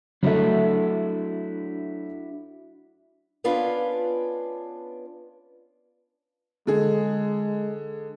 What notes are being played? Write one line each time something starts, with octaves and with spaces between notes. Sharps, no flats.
F#3 A3 D4 E4 F#4
B3 C#4 D4 F4 B4
D3 G#3 G#4